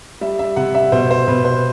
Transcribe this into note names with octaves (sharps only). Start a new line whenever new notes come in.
G3 E5
E5
C3 F#5
E5
B2 C5
C5
B2 B4
C5